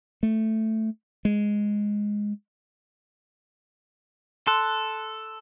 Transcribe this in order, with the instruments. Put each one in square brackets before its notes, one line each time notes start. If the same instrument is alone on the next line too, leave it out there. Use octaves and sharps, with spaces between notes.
[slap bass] A3
G#3
[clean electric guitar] A4 [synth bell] C6 F#6